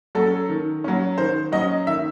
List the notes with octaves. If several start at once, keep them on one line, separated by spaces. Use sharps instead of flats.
F#3 C#4 A4
D#3
F#3 C#4
D#3 C5
F#3 C#4 D#5
D#3 E5